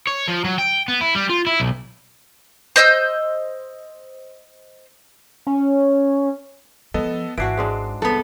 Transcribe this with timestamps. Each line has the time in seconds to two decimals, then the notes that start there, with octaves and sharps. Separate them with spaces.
0.07 C#5
0.28 F3
0.44 F#3
0.58 G5
0.88 B3
1.01 E4
1.15 G3
1.30 F4
1.47 E4
1.60 B1
2.76 C5 D#5 E6 G6
5.47 C#4
6.94 F3 G#3 B3 A4 D#5
7.38 G#1 E3 D4 F#4 C7 D7
7.57 G#2 G#3 D4
8.02 C2 B3 A4